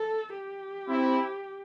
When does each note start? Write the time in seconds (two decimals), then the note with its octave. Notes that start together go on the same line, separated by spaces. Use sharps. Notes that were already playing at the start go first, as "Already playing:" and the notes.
Already playing: A4
0.34 G4
0.87 C4 E4